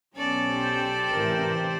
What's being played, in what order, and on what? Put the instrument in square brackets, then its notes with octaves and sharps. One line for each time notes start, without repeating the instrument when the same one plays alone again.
[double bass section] B1 [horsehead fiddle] B3 C#4 [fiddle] A4 D5
[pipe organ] G4 C5
[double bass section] A1 C3 E3 [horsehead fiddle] A#4